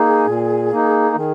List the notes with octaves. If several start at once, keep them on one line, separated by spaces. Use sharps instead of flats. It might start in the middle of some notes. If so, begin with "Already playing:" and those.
Already playing: A#3 D#4 G#4
A#2
A#3 D#4
D#3 G#4